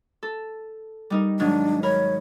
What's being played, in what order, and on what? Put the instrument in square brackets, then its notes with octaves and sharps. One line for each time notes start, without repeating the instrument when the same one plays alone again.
[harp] A4
G3 D#4 A#4
[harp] G#2 D#3 F#3 [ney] D4
[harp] A#4 B5 [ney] C#5